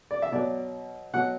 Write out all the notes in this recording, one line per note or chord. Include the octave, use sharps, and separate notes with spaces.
D5
E5
B2 F#3 D5
B2 F#3 F#5